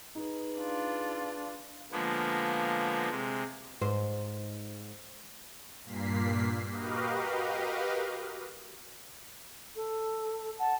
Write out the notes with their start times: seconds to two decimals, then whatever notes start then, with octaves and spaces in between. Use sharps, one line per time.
0.15 D#4 G#4 B4
0.58 D4 F4
1.92 D3 F3 G#3 A#3 B3
3.10 C3 G#3
3.81 G#2 C5
5.85 G2 A#2 A#3 B6 C7
6.72 F#4 G4 A#4 B4 D#5 F5
9.76 A4
10.59 F#5 A5